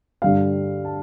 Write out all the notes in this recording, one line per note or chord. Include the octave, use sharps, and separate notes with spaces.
G2 D3 G3 F5
A5